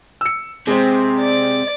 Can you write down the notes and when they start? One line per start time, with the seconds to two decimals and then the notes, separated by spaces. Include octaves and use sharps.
0.21 E6 C#7
0.67 C3 G#3 C4
1.20 D5